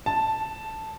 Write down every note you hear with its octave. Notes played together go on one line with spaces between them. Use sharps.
A5